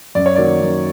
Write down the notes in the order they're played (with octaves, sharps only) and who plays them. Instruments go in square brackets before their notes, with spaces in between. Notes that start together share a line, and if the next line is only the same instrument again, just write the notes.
[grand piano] F#2 D5
C#5
D#3 F#3 A#3 D5
F#2